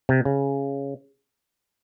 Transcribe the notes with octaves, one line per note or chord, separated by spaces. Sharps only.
C3
C#3